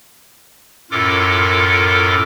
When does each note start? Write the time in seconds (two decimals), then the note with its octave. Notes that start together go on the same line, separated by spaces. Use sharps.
0.91 F#2 A2 F4 A4 A#4 D6